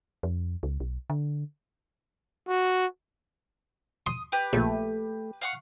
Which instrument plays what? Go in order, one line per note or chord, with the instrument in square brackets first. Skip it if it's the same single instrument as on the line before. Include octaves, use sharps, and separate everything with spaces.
[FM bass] F2
C#2
B1
D3
[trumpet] F#4
[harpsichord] C6 [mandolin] D#6
[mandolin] G4 B4
[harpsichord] A#1 [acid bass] A3
[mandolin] F5 F#5 C#6